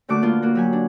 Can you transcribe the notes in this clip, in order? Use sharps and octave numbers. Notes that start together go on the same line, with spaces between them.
A#2 D3 A3 F#4 D6
A#3 B3 F4
A#3 F#4
F#3 G4 G#5
D4